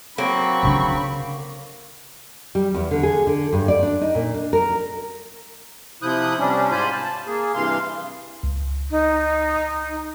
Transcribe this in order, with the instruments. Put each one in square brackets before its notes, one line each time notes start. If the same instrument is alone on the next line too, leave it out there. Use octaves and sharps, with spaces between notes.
[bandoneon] F#3 C4 [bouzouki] A#3 [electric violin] B5 C#6
[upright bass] C#3 D4
[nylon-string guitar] G3
E2
D3
G#4
D3
G2
D5
D4
D#4
A#2
D4
A#4
[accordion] C3 F3 E4 D#6 F#6 G6
C3 G3 C#4 D4
G#2 F4 C5 G#5 B5 G6
A5
A#3 G#4
G2 C3 E3 F5 C6
[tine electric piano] C#2
[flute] D#4